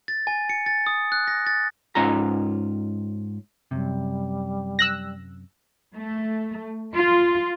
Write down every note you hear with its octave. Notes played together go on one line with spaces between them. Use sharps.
A6
G#5
C#7
A6
D#6
F#6
A#6
A6
G#2 C#4 F4 A#5
F#2 C3 G3
E6 F#6 A#6
A3
F4